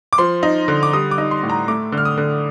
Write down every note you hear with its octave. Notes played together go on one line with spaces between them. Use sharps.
D6
F3 C6
D#4
D3
D6
G3 D#6
D6
D#4
C6
A2
A#5
A3 D6
D3
F6
D#6
D3